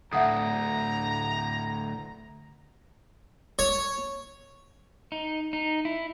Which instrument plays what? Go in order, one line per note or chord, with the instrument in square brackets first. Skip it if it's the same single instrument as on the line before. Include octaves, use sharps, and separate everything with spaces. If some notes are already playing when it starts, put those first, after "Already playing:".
[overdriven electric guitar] D2 A2 [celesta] E5 F#5 D#6 [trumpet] A#5
[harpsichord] C#5
[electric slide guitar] D#4
D#4
E4